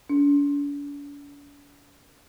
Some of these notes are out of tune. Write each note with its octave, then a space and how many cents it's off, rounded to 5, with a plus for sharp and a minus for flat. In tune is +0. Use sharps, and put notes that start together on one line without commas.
D4 -45